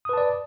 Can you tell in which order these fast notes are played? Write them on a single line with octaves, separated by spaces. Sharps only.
D#6 B4 A5 D5